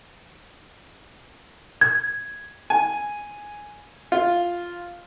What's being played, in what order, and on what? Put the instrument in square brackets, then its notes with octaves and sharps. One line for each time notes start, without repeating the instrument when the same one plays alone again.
[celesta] G#6
[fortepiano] G#5
F4